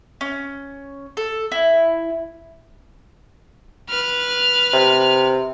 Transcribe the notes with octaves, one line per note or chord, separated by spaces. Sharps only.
C#4
A4
E4
B4 F6
C3